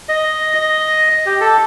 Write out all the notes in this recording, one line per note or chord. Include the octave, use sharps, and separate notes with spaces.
D#5
D#5
G4
A4